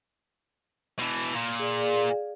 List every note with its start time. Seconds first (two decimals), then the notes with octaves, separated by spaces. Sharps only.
0.99 B2 E3
1.34 A#2
1.59 G#4 D5 F5